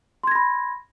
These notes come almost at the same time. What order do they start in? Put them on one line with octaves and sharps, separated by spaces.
C6 G#6 A#6 B5